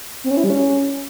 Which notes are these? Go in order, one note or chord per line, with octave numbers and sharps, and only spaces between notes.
C4
C#4
E4
G3
C#4